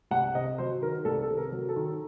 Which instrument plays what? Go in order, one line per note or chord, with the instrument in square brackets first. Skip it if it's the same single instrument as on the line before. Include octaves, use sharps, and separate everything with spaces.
[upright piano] C2 F#5
C3 D#5
F#3 C5
D#3 A#4
C2 A4
A4
C3
A#4
F#3
A4
D#3